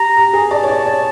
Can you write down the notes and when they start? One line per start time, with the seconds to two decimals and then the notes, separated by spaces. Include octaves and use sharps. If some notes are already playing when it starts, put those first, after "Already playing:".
Already playing: G4 A#5
0.17 G4
0.33 G#4
0.51 D5 A5
0.63 C#5
0.68 D5
0.86 C#5